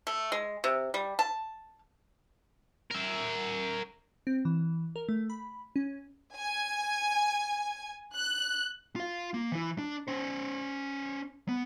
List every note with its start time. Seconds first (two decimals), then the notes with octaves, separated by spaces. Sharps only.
0.07 A3
0.32 G#3
0.64 C3
0.94 G3
1.19 A5
2.91 A#4 E5
4.27 C4
4.45 E3
4.96 A#4
5.08 A3
5.30 B5
5.76 C#4
6.37 G#5
8.16 F#6
8.96 F4 F5
9.34 A#3
9.52 E3 E4
9.78 D4
10.08 C#4 C5
11.49 B3